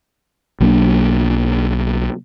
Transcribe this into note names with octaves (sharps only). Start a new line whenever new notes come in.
B1 F#3 A#3 D4